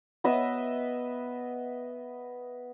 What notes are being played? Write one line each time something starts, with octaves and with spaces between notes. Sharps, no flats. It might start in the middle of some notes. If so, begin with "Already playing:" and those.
B3 B4 D#5 E5